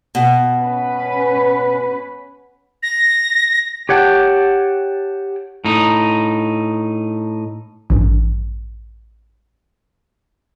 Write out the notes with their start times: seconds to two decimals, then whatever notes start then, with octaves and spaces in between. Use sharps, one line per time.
0.15 B2
0.62 C#4 B4
2.83 A#6
3.89 G4 C#5 F#5 G5 A5
5.65 A2 D#4
7.90 A1 G2